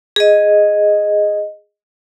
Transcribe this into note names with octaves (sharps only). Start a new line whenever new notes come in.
G#4 D#5